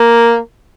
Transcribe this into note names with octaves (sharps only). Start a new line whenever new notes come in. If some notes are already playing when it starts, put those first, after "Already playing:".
Already playing: A#3